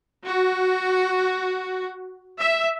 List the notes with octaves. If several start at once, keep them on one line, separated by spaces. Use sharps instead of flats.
F#4
E5